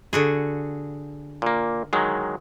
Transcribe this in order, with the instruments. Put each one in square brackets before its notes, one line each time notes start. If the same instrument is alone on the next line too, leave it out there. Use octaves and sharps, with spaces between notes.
[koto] D3 F#4 G#4
[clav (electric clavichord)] A#2 A#3
D#3 F#3 G#3